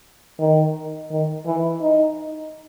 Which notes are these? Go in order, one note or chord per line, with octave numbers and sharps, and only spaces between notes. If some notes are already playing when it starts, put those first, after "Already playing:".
D#3
D#3
E3
D#4